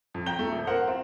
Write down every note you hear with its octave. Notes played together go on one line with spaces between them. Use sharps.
F2
G5 A#5 G6 G7
A3
D#1
A#4 C5 F#5
C4 F4